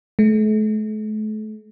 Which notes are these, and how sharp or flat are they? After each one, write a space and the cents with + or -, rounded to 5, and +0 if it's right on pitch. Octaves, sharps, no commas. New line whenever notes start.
A3 -40